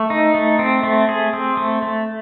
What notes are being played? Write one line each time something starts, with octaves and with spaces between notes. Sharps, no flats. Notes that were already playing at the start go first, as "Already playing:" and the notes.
Already playing: A3
D#4
A3
C4
A3
G#4
C4
A3
A3